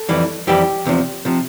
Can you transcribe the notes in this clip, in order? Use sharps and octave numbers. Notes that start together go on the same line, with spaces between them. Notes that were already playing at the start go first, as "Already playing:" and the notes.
Already playing: A4
F2 E3 G3
F2 E3 G3 G4
E2 C3 F3
C3 F3